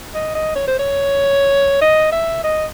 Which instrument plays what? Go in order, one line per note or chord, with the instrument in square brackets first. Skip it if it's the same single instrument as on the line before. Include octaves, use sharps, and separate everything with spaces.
[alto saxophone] D#5
D#5
C#5
C5
C#5
D#5
E5
D#5